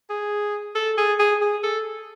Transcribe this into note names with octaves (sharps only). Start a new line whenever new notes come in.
G#4
A4
G#4
G#4
G#4
A4